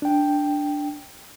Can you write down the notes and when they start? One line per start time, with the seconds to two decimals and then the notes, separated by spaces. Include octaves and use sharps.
0.02 D4 G5